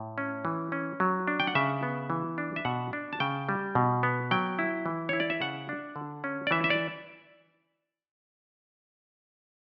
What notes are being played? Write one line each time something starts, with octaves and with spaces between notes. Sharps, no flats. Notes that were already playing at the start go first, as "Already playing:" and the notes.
Already playing: A2
C#4
E3
C#4
F#3
D4
G5
F#5
C#3 E5
B3
E3
D4
E5
B2 F#5
D4
A5
C#3 G5
G3
B2
B3
F#3 G5
E4
E3
E4 C#5
D5
E5
C#3 F#5
D4
D3
C#4
D5
E3 E5
E5
D5